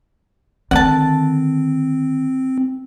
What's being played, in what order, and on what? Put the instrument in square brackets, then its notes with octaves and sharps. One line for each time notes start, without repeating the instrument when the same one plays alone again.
[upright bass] D3 D#3 [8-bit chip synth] C4 [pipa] F#5 A5